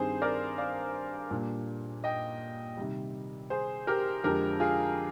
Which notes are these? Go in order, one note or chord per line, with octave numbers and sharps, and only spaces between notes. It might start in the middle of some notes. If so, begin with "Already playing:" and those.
Already playing: G2 D#3 G3 C4 G#4 C5
A#4 D5
D5 F5
A#2 G3 A#3 D4
D#5 G5
C3 D#3 G3
G#4 C5
G4 A#4
F2 D3 F3 G#3 G4 A#4
F4 G#4